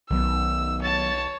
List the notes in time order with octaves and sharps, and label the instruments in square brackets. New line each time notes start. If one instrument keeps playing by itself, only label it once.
[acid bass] B1 [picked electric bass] D#3 F#3 B3 [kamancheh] E6
[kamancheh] C#5 [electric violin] A5 A6